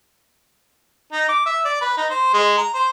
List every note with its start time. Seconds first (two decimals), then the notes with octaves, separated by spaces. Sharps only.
1.13 D#4
1.29 D6
1.46 E5
1.65 D5
1.81 B4
1.97 D#4
2.10 C5
2.33 G#3
2.58 A#5
2.74 C5